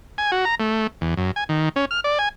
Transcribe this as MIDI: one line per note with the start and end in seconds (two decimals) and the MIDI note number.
0.18 0.31 80
0.32 0.45 66
0.45 0.55 82
0.60 0.87 57
1.01 1.14 40
1.17 1.31 42
1.36 1.44 80
1.49 1.69 51
1.76 1.85 61
1.91 2.00 89
2.04 2.18 74
2.19 2.29 80